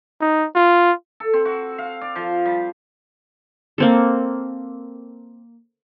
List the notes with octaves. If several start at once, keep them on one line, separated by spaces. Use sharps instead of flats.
D#4
F4
A4
C4
F#4
F5
D5
F3
G3
A#3 C4 A4